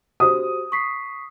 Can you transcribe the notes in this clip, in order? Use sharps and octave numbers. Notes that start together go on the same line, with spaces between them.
F#4 G4 C5 D#6
C#6 B6 C7